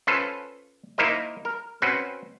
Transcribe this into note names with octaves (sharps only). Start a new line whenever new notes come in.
C#4 F4 A4 B4 C5
A#3 D#4 E4 A#4 C5 D#5
A#4
C4 C#4 F#4 B4 C5